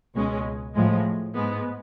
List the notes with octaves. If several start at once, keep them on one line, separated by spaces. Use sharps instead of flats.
C#2 B2 G#3 C#4
A2 F3 G#3
G#2 G#3 B3